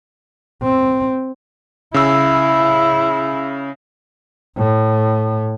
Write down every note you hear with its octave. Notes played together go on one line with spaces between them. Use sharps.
C4
C#3 E4 E6
A2